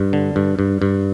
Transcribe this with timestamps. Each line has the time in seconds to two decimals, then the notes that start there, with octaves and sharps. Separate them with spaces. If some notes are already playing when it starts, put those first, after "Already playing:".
Already playing: G2
0.13 D3
0.36 G2
0.59 G2
0.82 G2